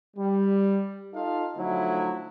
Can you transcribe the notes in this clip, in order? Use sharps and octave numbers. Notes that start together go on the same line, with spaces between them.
G3
D#4 F4 A4 D#5 F5
D3 F3 F#3 A3 D#4 E4